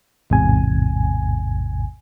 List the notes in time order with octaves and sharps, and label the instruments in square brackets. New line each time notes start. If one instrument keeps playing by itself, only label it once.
[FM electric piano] A1 E2 G#2 C3 G#5